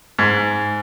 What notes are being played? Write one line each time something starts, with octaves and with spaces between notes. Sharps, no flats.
G#2